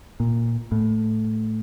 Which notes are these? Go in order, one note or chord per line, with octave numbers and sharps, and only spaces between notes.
A#2
A2